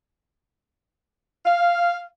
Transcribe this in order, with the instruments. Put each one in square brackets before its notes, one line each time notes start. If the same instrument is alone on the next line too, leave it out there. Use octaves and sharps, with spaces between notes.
[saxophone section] F5